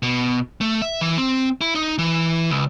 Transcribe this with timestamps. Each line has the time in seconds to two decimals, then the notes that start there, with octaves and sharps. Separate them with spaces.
0.02 B2
0.61 A3
0.82 E5
1.01 E3
1.18 C4
1.61 E4
1.75 D#4
1.98 E3
2.50 C#2